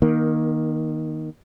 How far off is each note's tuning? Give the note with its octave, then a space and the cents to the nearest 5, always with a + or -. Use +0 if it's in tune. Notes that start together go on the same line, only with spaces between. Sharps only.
D#3 +0 A#3 +20